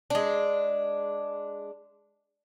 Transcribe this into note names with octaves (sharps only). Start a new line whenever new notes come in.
G#3 D4